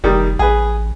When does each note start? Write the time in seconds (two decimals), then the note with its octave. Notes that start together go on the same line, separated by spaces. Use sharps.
0.04 F1 D#3 G3
0.39 A1 G#4 B4